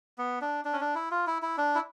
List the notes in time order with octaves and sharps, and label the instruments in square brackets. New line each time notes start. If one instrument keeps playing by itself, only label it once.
[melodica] B3
D4
D4
C#4
D4
E4
F4
E4
E4
D4
E4